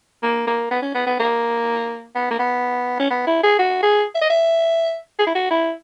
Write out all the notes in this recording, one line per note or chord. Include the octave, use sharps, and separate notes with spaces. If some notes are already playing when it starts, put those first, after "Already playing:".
A#3
A#3
B3
C#4
B3
B3
A#3
B3
A#3
B3
C#4
B3
E4
G#4
F#4
G#4
E5
D#5
E5
G#4
E4
F#4
E4